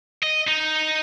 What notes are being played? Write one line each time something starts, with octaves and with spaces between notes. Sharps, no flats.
D#5
D#4